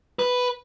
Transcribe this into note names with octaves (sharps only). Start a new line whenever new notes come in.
B4